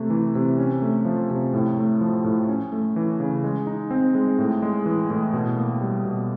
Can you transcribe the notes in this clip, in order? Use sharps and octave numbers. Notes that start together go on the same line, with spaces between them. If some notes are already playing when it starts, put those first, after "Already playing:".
Already playing: C3 A3
E3
C3
C#4
A3
F3
C3
A2
A3
F3
A2
C#4
A3
E3
C#3
G#3
D#4
C4
G#3
A2
G#3
E3
A2
B2
A#3
G3
B2